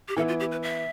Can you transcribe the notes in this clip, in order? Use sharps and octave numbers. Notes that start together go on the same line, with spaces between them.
G4
E3 B3 E4 A4
F4
G4
B4
E5